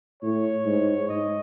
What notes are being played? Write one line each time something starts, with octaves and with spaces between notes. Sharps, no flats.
A2 C#5
G#2
G#2 D#5